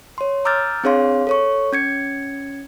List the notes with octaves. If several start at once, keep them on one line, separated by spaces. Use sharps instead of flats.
C#5 C6
A#5 D6 E6 F6 G6 A6
C4 D4 G#4 C#5 F5 C6
A4 C#5 C#6
C#4 G#6 C#7